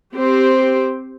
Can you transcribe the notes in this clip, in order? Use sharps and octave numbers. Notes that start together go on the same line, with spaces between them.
C4 G4 C5